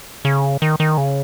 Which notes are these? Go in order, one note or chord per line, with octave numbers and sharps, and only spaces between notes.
C#3
D#3
D#3
C#3